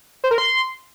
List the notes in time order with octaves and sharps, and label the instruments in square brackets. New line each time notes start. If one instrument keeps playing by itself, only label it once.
[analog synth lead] C5
A#4
C6